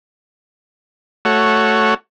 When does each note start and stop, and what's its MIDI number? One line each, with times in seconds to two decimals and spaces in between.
1.25 1.94 57
1.25 1.94 66
1.25 1.94 73